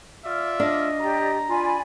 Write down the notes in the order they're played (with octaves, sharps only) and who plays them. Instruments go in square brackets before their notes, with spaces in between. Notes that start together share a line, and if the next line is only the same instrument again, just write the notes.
[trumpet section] F4 D5 E5 [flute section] F6
[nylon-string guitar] D4 [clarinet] D#5
[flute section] G4 D5 [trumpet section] A#5
[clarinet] F4 [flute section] D5 G#5 B5